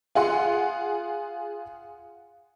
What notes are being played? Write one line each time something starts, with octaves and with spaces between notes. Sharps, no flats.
F4 G#4 F#5 C6